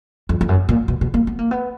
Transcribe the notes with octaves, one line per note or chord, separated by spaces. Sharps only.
F2
F2
F#2
A#2
B2
B2
A#3
B3
A#3
B3